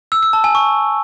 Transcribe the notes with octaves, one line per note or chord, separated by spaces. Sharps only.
E6
E6
A5
G#5
C#6